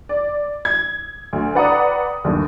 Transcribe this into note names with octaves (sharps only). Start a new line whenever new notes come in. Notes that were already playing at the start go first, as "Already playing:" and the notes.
D5
G#6
D2
B4 D5 F#5 G5 A#5 D#6
G1 D#2